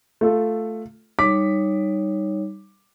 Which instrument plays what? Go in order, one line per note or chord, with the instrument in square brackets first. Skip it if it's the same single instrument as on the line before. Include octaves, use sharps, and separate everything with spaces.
[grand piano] A3 F4 A4
[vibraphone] G3 D#4 C#5 [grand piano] D6 B6